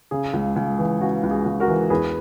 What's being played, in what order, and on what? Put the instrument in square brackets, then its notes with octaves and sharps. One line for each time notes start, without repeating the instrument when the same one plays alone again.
[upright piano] C#3 [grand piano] G#4
[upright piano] C#2
C#2
E3
[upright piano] C#3 [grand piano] F#4
[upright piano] C#2
[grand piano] G#4
[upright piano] C#2
[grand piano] F#4 A#4
[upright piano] E3
[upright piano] E2 [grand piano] G#4 B4